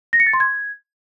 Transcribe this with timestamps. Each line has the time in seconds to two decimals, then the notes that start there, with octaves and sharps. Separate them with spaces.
0.13 A#6
0.20 C#7
0.27 A6
0.33 C6
0.40 G#6